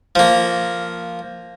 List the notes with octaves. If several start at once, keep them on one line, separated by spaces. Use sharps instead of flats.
F3 A#3